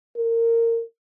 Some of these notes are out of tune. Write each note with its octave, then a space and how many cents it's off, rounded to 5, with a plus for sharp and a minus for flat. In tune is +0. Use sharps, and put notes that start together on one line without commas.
A#4 -20